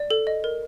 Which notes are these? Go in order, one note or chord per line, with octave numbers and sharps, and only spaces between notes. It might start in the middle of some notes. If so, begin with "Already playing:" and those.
Already playing: D5
A4
D#5
A#4